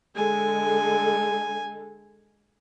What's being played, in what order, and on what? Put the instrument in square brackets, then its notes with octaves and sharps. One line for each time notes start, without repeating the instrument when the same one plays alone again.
[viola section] D3 G#3 A4 [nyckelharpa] G#5